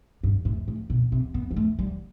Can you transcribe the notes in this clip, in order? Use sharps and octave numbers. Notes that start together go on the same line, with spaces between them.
G2
A2
A2
B2
C3
B3
G3
A3
G3